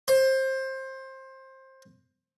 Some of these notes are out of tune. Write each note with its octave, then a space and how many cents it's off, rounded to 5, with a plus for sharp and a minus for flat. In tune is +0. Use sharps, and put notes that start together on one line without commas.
C5 +20